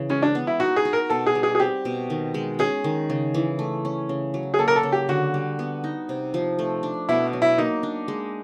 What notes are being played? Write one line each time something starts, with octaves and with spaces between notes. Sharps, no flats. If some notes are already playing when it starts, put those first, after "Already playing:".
Already playing: C#3 E3
G#3 C#4
D4
B3
E4
D#4 F#4
G#4
F#4
A#4
B2 A4
G#4
G3
G#4
G#4
C4 G4
B2
D#3
G#3
C#4 G#4
D#3
C#3
E3
A3
C#4
C#3
F#3
G#4
A#3 A4
A#4
A4
C#3
G4
D3 F#4
G3
B3
D#4
C3
F3
A3
D4
B2 E4
F#3
E4
A#3 D#4
D4
G#3